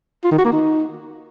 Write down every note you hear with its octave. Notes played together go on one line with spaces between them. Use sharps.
F4
D#3
F#4
A#3
D#4